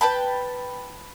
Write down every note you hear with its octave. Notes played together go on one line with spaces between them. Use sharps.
B4 G5 A5 B5